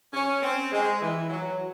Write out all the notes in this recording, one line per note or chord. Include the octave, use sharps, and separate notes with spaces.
C#4
C4
G#3
E3
F#3